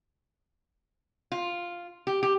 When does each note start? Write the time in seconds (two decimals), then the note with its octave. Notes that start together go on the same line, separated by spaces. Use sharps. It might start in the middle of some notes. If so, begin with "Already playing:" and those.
1.32 F4
2.07 G4
2.23 G4